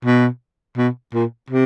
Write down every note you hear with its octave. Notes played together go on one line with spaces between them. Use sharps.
B2
B2
A#2
C3